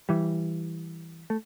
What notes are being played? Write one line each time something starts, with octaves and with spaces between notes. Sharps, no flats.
E3 G3
A3